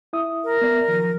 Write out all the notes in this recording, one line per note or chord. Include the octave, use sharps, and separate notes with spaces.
E4 E5 D#6
A#4
B3 D5 E5
D#3 F3 F#3